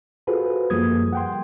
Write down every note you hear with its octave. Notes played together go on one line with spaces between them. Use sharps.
F4 F#4 G#4 A4 B4 C5
F#2 F3 G3 A#3 D#6 G#6
F#5 G5 C6